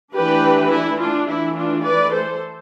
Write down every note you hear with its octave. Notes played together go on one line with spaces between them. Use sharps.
E3 A3 D4 G4 B4
E4
D4 F4
E3 A3 D4 E4
D4 F4
B4 D5
A4 C5